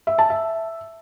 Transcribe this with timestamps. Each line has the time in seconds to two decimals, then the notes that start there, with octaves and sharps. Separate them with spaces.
0.07 E5
0.18 A5
0.30 E5